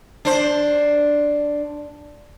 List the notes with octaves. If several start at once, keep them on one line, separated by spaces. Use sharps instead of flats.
D4 C5